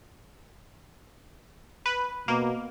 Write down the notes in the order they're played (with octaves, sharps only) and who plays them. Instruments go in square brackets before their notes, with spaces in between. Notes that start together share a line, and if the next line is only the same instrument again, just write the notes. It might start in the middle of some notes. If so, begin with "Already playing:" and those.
[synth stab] B4
[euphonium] B2 [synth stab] A#3